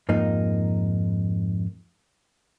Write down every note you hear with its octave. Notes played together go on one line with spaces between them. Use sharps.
F2 G#2 A#3 D#4